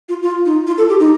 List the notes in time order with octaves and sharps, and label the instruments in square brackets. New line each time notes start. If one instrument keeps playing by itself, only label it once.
[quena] F4
F4
D#4
F4
A4
G4
D#4